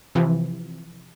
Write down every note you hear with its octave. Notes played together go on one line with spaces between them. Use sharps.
C3 E3 F3